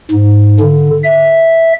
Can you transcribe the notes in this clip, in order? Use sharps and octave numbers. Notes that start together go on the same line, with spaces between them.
G#2
D3
E5